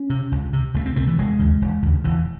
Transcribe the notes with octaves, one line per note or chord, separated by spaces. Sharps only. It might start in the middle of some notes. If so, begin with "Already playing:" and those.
Already playing: C#4
C3
C#2
C3
C#2 A3
C4
C3 A3
E3
E1 G#3
D#2 C#3
E1
D#2 C#3
E1 E3